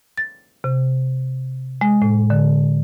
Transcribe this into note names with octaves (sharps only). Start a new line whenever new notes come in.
A6
C3
G#3
A2
D3